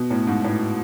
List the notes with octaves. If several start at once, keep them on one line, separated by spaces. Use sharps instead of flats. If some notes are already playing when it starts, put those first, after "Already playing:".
Already playing: B2
A2
G#2
A2